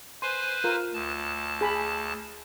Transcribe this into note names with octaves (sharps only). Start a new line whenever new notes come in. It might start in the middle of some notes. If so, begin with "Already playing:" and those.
B4 C5 G#5 C6
F4 A#4
D2 A5
G#4 B5